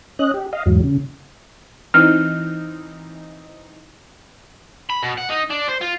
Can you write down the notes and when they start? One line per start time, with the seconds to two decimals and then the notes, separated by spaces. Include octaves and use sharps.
0.19 C#4 D#5 F#6
0.34 G4
0.53 D#5 F5
0.66 E2 G#2 F#3
0.84 C#3
1.94 E3 C4 D#4 F6
4.90 B5
5.03 B2
5.18 F#5
5.30 D#4
5.50 D4
5.68 C5
5.81 F4